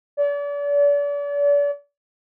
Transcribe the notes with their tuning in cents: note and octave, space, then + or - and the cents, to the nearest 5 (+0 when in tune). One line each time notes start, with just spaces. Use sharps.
D5 -40